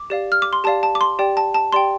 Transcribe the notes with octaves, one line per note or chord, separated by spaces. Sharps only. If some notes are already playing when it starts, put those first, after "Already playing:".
Already playing: D6
G4 D5 F5
F6
D6
C6
G4 D5 F5 A5
A5
D6
C6
G4 D5 G5
A5
A5
G4 D5 G5 C6